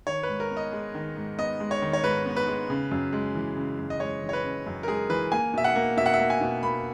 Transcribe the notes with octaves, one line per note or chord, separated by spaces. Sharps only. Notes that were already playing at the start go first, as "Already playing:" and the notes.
D#3 C#5
B4
G#2
A#4
B3
D#5
G#3
D#3
G#2
B3 D#5
G#3
C#5
D#3
C#5
G#2 B4
B3
B4
G#3
C#3
F#2
G#3
E3
C#3
F#2
D#5
G#3 C#5
E3
C#5
B4
C#3
F#2
A#4
G#3 G#4
E3 B4
A#3 G#5
B2 E5
F#5
A#3
B2 E5
F#5
E5
A#3
G#5
B2
A#3 B5